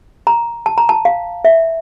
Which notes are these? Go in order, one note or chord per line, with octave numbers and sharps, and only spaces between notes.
A#5
A5
A#5
A5
F5
E5